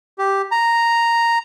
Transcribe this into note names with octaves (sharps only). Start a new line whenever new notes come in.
G4
A#5